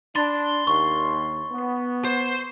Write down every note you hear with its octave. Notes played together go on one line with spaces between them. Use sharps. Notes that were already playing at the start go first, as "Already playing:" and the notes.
D4 B5 C6 A6
D#2 C#6
B3
C5